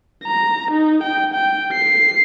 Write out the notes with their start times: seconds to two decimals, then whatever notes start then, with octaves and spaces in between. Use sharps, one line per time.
0.24 A#5
0.71 D#4
1.03 G5
1.34 G5
1.73 C7